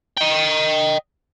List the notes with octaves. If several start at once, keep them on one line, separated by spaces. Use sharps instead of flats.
D#5 G5